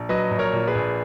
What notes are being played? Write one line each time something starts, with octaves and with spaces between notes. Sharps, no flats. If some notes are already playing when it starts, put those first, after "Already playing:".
Already playing: A#1
F#3 B4 D#5
A#1
A#4 C#5
A#2
G#4 B4
A#1